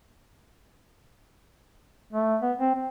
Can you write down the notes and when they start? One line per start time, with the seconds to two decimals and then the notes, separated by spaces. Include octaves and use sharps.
2.13 A3
2.42 B3
2.59 C4
2.75 C4